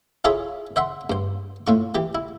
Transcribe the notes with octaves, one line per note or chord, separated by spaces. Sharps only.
E4 F4 G#4 A4 C#5 E5
C5 E5 F#5 C6
G2 C5
A2 F4 C#6
E3 G4
E4